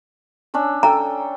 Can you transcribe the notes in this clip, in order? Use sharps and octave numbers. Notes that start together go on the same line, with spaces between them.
C#4 D4 E6
A4 G5 A#5